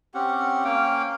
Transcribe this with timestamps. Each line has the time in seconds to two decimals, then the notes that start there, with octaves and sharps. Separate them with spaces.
0.14 C4 C#4 G4 F#5
0.65 A#3 C#4 F5 G5